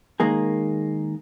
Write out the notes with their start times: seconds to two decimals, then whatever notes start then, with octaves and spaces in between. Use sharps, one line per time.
0.20 D#3 G#3 A#3 G#4